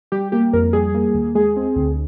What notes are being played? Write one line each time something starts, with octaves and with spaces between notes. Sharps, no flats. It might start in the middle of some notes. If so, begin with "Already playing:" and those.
G3 G4
A#3 G4
F2 A#4
G3 G#4
A#3
D#2
G#3 G#4
C4
D2